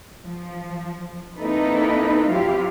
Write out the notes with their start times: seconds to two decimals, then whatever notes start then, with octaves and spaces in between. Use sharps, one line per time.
0.24 F3
1.38 A#3 C4 D#4 E4 A4 B4
2.29 F#3 C4 E4 F4 G4 F5